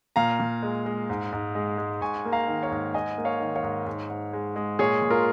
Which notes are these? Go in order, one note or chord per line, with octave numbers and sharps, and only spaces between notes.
A#2 F5 A#5
A#2
G#3
G#3
G#2
G#2
G#3
G#3
G#2 G#5 C#6
A#3
F5 A#5
D#3
C#5 F5
G#2
G#2 D#5 G#5
A#3
C#5 F5
D#3
C#5 F5
G#2
G#2
G#2
G#3
G#3
A#2 G#4 C#5
A#2
F4 A#4